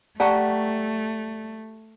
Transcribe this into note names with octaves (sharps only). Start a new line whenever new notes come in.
A3 G4 D5 F#5 A5 A#5 C#6